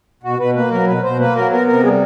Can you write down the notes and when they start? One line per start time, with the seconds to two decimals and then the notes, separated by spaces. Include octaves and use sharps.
0.23 B2 F#4
0.39 B2 B4
0.55 A#3 B4
0.71 F#3 A#4
0.87 B2 B4
1.03 B2 C5
1.18 A#3 B4
1.35 F#3 A#4
1.51 B3 A#4
1.67 C3 A#4
1.83 G3 G#4